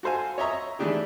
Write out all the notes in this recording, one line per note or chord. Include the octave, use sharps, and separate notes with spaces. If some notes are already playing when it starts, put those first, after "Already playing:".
F#4 A4 C5 F5 G#5
C#5 D#5 E5 A#5 C#6
E3 G#3 A3 D4 D#4 G4